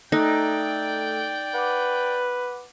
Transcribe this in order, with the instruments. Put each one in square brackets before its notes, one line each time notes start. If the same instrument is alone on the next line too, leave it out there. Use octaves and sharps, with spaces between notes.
[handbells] A3 A4 F#6 [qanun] D#4 [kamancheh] D5 G5
[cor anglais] B4 [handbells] F#5 D6